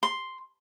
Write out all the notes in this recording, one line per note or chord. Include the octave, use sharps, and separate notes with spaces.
C6